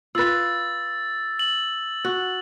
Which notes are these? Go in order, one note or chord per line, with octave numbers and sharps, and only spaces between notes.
F4 B4 E6 A6
F#7
F#4